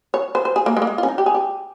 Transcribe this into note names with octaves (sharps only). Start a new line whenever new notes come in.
C#5
C5
C5
G#4
A#3
G#3
A#3
G#3
F4
C#4
D#4
G4
G#4
G4